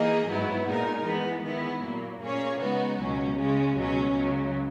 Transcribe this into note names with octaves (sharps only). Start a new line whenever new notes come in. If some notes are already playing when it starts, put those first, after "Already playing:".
Already playing: E3 A#3 D#4 G#4 D#5
G#2 F#3 B3 E4
A#2 G#3 D#4 A#4
E3 G#3 B3
D#3 G#3 B3 E4
A#2 F#3 A#3
A#2 A#3 C#4 G#4 C#5
C#3 G#3 B3 D#4 F#4
C#2 B2 F#3 C#4
C#3 G#3 C#4
C#2 B2 F#3 C#4
C#2 C#3 F#3